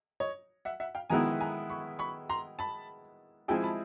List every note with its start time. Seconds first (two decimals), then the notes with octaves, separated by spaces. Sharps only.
0.20 C#5 D#5
0.65 E5 F#5
0.80 E5 F#5
0.95 F5 G5
1.10 D#3 G#3 B3 E4 G#5 A#5
1.41 G#5 A#5
1.70 B5 C#6
1.99 B5 C#6
2.30 A#5 C6
2.59 A5 B5
3.48 F3 G#3 C4 E4 G#4 G5 A5
3.63 A5 B5